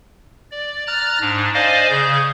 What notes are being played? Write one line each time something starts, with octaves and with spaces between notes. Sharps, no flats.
D5
A#5 F6 F#6 A6
G#2 D4
C5 D5 D#5 F5 G#5
C#3 G#4 G6